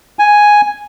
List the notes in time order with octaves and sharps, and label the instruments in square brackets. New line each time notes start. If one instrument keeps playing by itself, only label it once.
[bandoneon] G#5